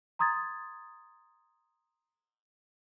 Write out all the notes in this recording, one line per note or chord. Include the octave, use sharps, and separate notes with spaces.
A#5 C6 D#6 G#6 A6